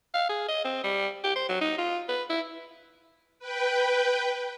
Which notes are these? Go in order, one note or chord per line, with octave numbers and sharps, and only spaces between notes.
F5
G#4
D#5
C4
G3
G4
C5
F#3
D#4
F4
B4
E4
B4 G5